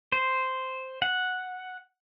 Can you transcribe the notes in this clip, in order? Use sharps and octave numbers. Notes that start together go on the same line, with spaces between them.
C5
F#5